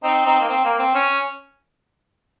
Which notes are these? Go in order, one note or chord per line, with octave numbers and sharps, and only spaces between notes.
C4 D#4
C4 D#4
A#3
C4
A#3
C4
C#4